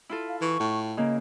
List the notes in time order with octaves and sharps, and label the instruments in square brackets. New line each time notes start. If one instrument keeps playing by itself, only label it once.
[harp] E4 F4 A4
[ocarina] F5
[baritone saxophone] E3 [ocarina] C#6
[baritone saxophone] A2
[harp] C#3 A#3 [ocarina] D#5